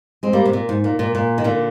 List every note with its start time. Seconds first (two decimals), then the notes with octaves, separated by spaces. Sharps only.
0.23 G#3 C4
0.33 G3 A#3
0.45 C3
0.53 A#2
0.69 G#2
0.84 A#2
0.99 A#2
1.15 A#2
1.38 D#3
1.44 A#2 D3